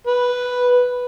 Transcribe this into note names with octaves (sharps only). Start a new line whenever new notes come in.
B4